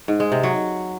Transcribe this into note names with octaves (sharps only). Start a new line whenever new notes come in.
G#2
G#3
C3
F#3